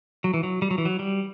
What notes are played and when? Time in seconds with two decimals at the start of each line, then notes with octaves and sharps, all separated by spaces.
0.24 F#3
0.34 E3
0.43 F#3
0.62 G3
0.71 F#3
0.78 E3
0.85 F#3
0.99 G3